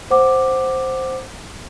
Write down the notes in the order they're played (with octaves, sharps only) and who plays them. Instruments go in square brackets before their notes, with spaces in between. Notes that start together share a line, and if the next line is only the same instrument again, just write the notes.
[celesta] C5 F#5 D6